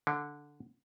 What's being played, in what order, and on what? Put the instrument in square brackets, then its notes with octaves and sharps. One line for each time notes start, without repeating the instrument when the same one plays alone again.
[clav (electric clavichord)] D3